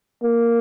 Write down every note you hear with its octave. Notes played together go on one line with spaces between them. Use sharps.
A#3